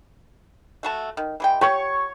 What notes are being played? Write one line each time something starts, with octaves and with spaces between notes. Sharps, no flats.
A3 F#4 A5
D#3
E3 G#3 G5
G4 C#5 C#6